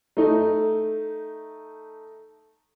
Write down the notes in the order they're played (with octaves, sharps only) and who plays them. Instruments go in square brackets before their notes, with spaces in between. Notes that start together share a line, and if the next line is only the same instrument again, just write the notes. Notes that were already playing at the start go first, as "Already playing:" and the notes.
[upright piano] A3 D#4